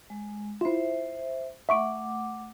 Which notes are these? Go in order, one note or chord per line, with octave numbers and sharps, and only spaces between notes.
G#3
E4 F4 C5 E5
A3 E5 F#5 C#6 D6 D7